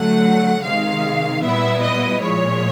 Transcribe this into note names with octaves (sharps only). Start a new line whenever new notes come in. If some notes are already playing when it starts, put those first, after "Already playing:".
Already playing: D3 F#3 A3 F#5
C3 D#3 G#3 F5
A#2 G3 B3 E4 E5
D#5
A#2 F3 G#3 C#5